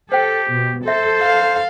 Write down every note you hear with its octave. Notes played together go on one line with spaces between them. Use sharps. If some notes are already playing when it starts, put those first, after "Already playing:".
G4 A4 C5 G5
B2
A4 C5 E5
F5